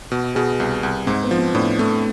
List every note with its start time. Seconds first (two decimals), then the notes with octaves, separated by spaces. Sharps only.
0.12 B2
0.35 B2 G#4 B4
0.60 C2
0.83 C2
1.07 G#2 C4
1.23 B3
1.31 F3
1.38 C4
1.55 A2 B3 D4
1.79 A3 C4 E4